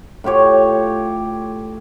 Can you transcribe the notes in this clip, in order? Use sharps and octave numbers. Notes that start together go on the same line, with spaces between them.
A2 F4 G4 C#5